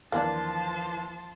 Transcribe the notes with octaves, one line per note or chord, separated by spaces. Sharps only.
D#2 E3 F3 A#3 D4 A5 C6